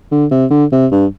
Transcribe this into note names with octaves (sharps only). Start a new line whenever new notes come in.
D3
C3
D3
C3
G2